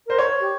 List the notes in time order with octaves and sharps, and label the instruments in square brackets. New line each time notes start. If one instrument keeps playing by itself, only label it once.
[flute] A#4 [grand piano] C5
[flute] C5 [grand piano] C#5
[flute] G4